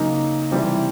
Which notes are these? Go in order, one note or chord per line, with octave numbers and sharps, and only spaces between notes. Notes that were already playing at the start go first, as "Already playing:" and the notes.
Already playing: C#3 F#3 A#3 D#4
C3 E3 G3 C4